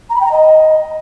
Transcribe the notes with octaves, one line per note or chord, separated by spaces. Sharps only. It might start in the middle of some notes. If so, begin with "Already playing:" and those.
A#5
B5
G5
A#5
D#5